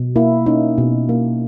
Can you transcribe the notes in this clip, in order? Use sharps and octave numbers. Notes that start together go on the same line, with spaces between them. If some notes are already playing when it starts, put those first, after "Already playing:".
Already playing: B2
A#3 E4
C#4 D#4
B2
A#3